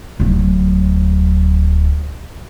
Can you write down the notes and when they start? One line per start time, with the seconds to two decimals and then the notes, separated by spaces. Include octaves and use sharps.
0.20 D1 F#3